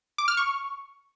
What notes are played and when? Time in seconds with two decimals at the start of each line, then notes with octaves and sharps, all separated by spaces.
0.18 D6
0.28 F6
0.37 C#6